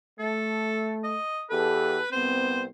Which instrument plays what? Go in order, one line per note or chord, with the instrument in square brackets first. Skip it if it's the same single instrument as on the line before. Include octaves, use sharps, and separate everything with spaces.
[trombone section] A3 [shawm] A4
[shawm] D#5
[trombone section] E2 G4 A4 [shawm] B4
[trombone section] C2 B3 C4 [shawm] C5